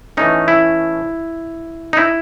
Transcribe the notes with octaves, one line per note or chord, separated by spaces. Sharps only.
E3 A3 C#4 D#4
E4
D#4
E4